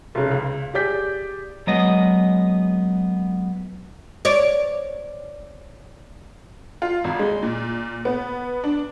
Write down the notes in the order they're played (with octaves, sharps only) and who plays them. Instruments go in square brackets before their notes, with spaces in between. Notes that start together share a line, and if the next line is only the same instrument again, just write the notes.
[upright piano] F1 C#3
C#2
G4 G#4 D5 G6 B6
[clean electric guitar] F#3 G#3 B3 D#5
[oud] C#5 D5
[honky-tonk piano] F4
G#1
G#3
A#2
B3
D4